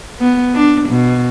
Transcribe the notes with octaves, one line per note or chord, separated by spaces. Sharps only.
B3
D4
B2